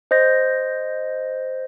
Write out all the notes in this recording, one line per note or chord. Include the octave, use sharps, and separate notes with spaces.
C5 D#5 G6 A#6